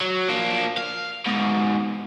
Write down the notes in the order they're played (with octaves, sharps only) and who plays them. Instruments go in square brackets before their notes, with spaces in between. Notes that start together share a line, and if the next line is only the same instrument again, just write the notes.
[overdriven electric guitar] F#3
A#3 D4
F5
G#2 B2